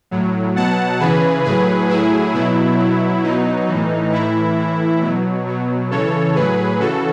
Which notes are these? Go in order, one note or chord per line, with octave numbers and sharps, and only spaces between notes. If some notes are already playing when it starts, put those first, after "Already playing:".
A2 F#3
B2 F#3 F#5 A5
C#3 E3 G#4 B4
A2 F#3 G#4 B4
A2 F#3 E4 G#4
B2 F#3 E4
B2 F#3
B2 F#3 D#4
A2 E3
A2 E3 E4
A2 E3
B2 F#3
B2 F#3
C#3 E3 A4 C#5
A2 F#3 G#4 B4
C#3 E3 F#4 A4